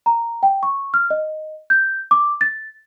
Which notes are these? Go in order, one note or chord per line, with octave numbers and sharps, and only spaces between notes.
A#5
G5
C#6
F6
D#5
G6
D6
A6